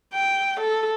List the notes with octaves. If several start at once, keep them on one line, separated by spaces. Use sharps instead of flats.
G5
A4